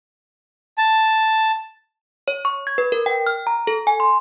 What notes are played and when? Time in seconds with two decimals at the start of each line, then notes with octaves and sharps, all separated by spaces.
0.78 A5
2.28 C#5
2.45 C#6
2.67 G#6
2.78 B4
2.92 A#4
3.06 G5
3.27 F6
3.47 A#5
3.67 A4
3.87 G#5
4.00 C6